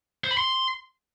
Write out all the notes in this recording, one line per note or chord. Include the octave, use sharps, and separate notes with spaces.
C5
B5
C6